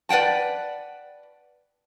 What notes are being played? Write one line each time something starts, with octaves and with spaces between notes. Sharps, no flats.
B4 D5 F#5 G5 A5